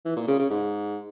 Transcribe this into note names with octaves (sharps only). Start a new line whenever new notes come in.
E3
A#2
C#3
C#3
G#2